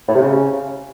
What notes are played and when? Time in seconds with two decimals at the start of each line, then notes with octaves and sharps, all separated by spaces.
0.09 A2
0.15 C3
0.22 C#3